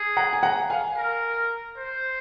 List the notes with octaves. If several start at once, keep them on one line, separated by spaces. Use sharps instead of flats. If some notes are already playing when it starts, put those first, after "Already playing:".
Already playing: G#4
F#5 A#5
G#5
F#5 A#5
F5 G#5
A#4
C5